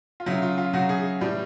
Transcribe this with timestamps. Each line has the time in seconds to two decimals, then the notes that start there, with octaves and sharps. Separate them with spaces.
0.20 F4
0.26 C#3 F#3 E4
0.42 F4
0.58 F4
0.73 C#3 F#3 F#4
0.89 G#4
1.21 A2 E3 G3